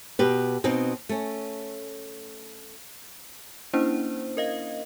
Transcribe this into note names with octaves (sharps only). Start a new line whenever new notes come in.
B2 G4 B4
B2 C4 D#4
A3 C#4
A#3 C#4 D4 E4 C5
A#4 D#5 F5